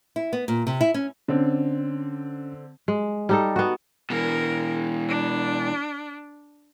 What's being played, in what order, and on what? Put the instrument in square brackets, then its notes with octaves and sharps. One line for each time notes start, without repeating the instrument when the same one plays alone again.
[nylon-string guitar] E4
B3
A#2
C3
E4
C#4
[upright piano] D3 C4 [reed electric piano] C#4
[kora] G#3
G3 D#4 A4
B3 F#4
[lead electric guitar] B2 E3 [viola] A#4
[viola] D4